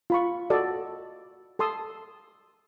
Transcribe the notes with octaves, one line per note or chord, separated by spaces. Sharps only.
F4 B5 C#6
F#4 A4 D5 D#5
A4 A5 C6 D#6 E6